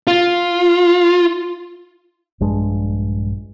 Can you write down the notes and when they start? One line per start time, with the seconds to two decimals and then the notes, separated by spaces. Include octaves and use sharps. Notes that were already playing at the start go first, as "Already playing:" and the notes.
0.07 F4
2.40 A#1 G2 G#3 D4